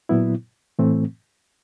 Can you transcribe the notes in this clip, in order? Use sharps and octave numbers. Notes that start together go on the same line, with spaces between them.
A#2 F#3 B3 E4
A2 E3 A3 C4